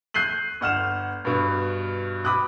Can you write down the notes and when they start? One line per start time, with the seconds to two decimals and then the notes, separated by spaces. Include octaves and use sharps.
0.14 F#6 G6 C7 D#7 F#7
0.61 G1 F#5 F6 E7
1.25 G2 B2
2.25 B5 D6 D#6 F#6